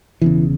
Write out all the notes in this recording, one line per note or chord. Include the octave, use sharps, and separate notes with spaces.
E1 E2 C#3 E3